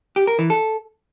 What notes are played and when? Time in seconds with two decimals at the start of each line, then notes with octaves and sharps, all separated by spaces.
0.16 G4
0.27 A#4
0.39 E3
0.50 A4